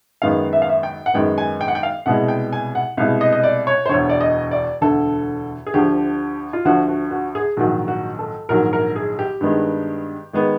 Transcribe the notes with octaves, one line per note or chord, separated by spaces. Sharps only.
F#2 D#3 G#3 B3 F5
E5
F5
E5
G5
F#5
F#2 D#3 G#3 B3 G5
G#5
G5
F#5
G5
F5
C2 B2 G#3 F#5
G5
G#5
F#5
C2 B2 G#3 F5
D#5
D#5
D5
C#5
C5
E1 D2 D3 C#5
D5
D#5
D5
E1 D2 D3 A4
G#4
D2 D3 F3 G4
F4
D2 D3 F3 F#4
F#4
F#4
G#4
A#1 G#2 D#3 F#3 F#4
F#4
A4
A#1 G#2 D#3 F#3 A#4
A#4
G#4
G4
G2 D#3 G#3 B3
D#3 G#3 B3